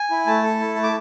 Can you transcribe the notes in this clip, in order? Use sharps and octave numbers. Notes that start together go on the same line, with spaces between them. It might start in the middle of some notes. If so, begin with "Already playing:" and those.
Already playing: G#5
E4
A3 A5
A4
E4
A3
D6